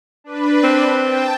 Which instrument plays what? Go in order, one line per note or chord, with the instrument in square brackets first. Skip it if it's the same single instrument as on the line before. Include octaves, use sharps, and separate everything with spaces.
[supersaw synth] D4 B4
[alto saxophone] C4
[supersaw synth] G5 A5